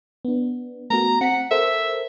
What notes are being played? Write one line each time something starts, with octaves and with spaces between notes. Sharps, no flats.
B3 D4
A3 B3 F#4 A#5
C4 F#5 B6
A4 A#4 C5 E5